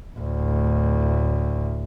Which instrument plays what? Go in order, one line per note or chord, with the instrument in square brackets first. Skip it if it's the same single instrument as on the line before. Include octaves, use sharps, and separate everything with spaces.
[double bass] D2 A2